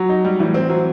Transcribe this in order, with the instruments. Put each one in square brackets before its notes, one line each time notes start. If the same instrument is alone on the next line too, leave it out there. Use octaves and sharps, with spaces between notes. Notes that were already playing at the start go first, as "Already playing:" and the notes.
Already playing: [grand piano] F#3
[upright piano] D#4
G3
[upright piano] A2 [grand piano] E3
[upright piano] C4
F#3